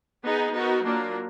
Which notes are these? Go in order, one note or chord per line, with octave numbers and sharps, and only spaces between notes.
B3 D#4 G#4
B3 D#4 F#4 A#4
F#3 A#3 D4 F4 A#4